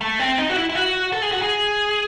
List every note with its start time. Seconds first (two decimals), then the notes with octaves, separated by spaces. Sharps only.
0.01 A3
0.19 C4
0.38 D#4
0.50 F#4
0.56 E4
0.69 E4
0.75 F#4
1.12 A4
1.22 G#4
1.32 F#4
1.42 G#4